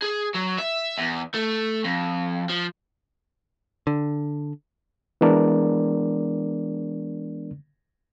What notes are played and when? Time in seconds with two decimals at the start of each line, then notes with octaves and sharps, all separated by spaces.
0.02 G#4
0.34 F#3
0.58 E5
0.99 E2
1.34 A3
1.84 F2
2.49 F3
3.87 D3
5.21 E3 G#3 B3 D4 A#4 D5